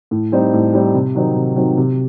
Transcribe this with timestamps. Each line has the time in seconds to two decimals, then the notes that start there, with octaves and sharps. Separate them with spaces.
0.11 A2
0.32 G3 C4 D#4
0.53 A2
0.74 G3 C4 D#4
0.94 C3
1.15 D#3 F#3 C4 D#4
1.36 C3
1.56 D#3 F#3 C4 D#4
1.77 C3